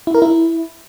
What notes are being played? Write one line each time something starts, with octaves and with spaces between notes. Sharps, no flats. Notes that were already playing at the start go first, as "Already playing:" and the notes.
E4
A#4
E4